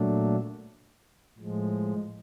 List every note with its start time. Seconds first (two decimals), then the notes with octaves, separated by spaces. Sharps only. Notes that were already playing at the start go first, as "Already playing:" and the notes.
Already playing: A#2 F#3 A3 D4
1.38 A2 F3 G#3